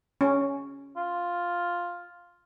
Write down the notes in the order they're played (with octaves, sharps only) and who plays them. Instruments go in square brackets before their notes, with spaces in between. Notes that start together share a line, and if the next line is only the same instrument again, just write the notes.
[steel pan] C#4
[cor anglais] F4